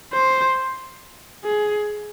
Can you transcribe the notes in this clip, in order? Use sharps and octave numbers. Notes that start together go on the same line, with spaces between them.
C5
G#4